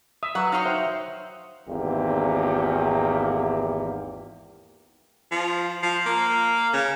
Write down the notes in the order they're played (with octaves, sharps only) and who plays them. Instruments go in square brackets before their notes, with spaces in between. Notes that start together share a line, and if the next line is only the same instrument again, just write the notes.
[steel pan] E5 [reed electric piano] D#6
[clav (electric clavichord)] F#3 [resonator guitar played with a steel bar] B4 F#5
[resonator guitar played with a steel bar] D#4 C#5 G5 [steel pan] F5
[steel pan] C5 [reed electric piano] E5
[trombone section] G#1 E2 A#3 G4
[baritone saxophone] F3
F3
A#3
C#3